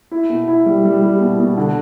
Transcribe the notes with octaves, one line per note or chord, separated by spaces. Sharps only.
E4
B2
E4
G3
G3
G3
B2
B2
D3